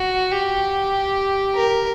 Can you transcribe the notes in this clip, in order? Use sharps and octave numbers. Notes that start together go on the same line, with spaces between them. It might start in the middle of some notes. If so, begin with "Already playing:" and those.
Already playing: F#4
G4
A#4